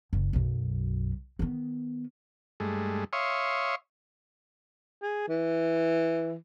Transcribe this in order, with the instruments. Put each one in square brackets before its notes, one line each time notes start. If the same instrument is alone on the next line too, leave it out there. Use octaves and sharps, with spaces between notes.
[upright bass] F#1
B1 F#2
D#3 B3
[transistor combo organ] G2 G#3 A3
C#5 E5 F5 C6 C#6 D#6
[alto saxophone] G#4
E3